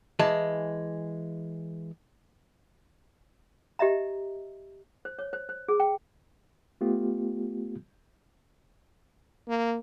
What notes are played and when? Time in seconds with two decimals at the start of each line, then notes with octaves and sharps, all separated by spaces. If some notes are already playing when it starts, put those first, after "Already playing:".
0.19 E3 G#3 A5
3.79 G4 D#5 E5 A#5
5.05 C5
5.19 C#5
5.33 C5
5.49 C5
5.68 G#4
5.80 G5
6.81 A3 B3 F4 G4
9.48 A#3